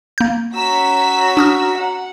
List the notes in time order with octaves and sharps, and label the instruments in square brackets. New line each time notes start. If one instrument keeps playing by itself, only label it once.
[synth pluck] A#3 G6
[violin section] C#4 E6 B6 [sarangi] F#4 [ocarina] A#5
[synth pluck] D4 D#6 F6
[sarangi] F#5